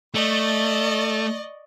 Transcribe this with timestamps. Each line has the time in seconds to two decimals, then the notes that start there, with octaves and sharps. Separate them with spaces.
0.14 A3 D5 D#5 C#6